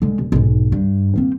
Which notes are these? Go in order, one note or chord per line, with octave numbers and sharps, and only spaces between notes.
D3 G#3
D#1
B1 G#2
G2
A#3 C4